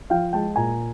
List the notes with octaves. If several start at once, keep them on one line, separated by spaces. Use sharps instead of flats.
F3 F5 G5
G#3 G5 A5
A#2 G#5 A#5